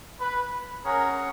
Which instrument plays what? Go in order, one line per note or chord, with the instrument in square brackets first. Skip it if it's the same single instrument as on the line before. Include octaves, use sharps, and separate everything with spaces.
[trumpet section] B4
[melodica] C#4 G#4 C#5 F#5 [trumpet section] A#4